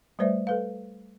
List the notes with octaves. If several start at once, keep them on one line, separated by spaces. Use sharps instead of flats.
G3 A3 B4 C5 D5 E5
A4 B4 F5